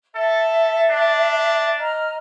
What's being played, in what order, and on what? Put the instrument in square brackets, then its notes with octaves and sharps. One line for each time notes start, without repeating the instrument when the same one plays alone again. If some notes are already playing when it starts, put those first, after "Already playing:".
[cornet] A4 [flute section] E5
[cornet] D4
[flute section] D#5 A#5 F6